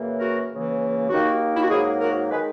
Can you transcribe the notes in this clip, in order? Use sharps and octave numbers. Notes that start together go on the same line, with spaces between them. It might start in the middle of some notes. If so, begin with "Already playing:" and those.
Already playing: F#2 C#3 E3 A#3
F#4 A#4
C#2 C#3 E3 A#3
D#2 D#3 A#3 D#4 F#4
E4
F#4
G#2 F#3 A#3 E4 G#4
F#4 A#4
D#3 G#3 G#4 B4